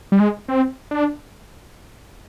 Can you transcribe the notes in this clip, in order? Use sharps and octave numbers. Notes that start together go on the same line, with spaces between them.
G3
G#3
C4
D4